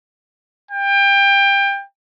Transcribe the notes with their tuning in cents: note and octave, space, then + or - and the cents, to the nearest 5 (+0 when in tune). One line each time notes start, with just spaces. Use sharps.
G5 +25